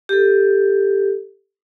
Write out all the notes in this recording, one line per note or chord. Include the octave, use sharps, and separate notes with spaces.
G4 A4